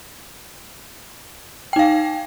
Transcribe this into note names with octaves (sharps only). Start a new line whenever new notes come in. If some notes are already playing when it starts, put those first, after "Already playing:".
D#4 F5 G5